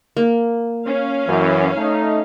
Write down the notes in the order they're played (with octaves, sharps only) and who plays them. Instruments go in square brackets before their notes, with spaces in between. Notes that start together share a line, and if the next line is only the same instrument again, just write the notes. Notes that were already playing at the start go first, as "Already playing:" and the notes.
[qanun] A#3
[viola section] C#4 F5
[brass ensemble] F#2 E3
A3 D#4